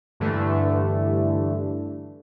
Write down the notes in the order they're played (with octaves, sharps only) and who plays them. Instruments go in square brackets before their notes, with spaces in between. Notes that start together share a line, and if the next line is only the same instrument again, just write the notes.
[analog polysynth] G2 D3 E3 A3